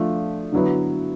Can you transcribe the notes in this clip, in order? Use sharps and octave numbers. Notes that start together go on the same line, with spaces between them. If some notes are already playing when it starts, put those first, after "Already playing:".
Already playing: F3 A3 D4 F4
D3 F#3 B3 E4